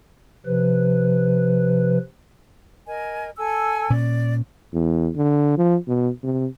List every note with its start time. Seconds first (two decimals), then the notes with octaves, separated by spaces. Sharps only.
0.46 C3 F3 B4
2.86 A#4 D#5 G#5
3.37 A4 G#5 E6
3.90 A#2 C#4 D5
4.73 E2
5.16 D3
5.58 F3
5.87 B2
6.23 C3